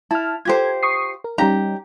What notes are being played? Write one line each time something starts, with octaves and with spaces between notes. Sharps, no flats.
E4 A5 F6
F4 G4 A4 C5 G#6
C#6 D#6 C7
A#4
G3 C#4 D#4 G4 A#5